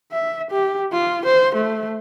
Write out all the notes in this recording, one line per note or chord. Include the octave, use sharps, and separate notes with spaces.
E5
G4
F4
C5
A3